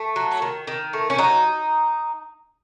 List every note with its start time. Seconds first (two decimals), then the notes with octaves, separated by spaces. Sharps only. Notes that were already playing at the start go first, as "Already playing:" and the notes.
Already playing: A3
0.16 F#3
0.42 D#3
0.67 D#3
0.93 A3
1.10 C#4
1.18 F#3 D#4